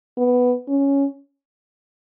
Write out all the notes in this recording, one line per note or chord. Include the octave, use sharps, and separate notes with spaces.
B3
C#4